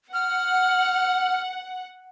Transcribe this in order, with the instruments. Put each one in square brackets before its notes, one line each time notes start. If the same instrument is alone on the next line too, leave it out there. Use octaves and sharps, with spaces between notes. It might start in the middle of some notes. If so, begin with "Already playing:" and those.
[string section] F#5 [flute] F6